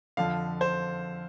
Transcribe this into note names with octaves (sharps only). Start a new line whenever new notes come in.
F2 D3 F3 F5
C5